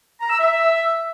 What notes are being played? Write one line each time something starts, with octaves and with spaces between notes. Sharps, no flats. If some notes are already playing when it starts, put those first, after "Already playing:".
A#5
E6
E5